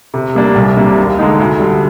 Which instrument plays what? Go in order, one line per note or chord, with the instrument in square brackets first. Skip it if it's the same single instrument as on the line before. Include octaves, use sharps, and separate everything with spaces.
[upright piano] C3
G3 A#3 D4
C2
C3 G3 A#3 D4
D#2
D3 G#3 D#4
D2
D3 G3